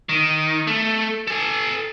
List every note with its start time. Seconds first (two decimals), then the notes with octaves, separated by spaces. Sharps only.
0.09 D#3
0.67 A3
1.27 A4 G#5